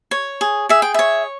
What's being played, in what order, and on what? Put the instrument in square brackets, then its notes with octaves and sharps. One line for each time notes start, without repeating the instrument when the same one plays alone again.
[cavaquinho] C#5
G#4
G#4 E5
G5
C#5 E5